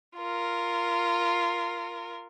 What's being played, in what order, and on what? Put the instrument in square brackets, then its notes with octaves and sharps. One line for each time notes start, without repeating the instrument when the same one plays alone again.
[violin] F4 A#4